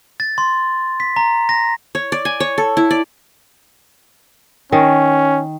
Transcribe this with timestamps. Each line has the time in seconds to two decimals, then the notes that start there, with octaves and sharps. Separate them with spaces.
0.20 A6
0.38 C6
1.00 B6
1.16 A#5
1.49 A#6
1.95 C#5
2.12 D5
2.25 G#5
2.40 C#5
2.58 A4
2.77 E4
2.91 D5
4.72 D#3 C#4